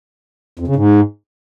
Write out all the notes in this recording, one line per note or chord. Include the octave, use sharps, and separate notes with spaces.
F2
C#3
G#2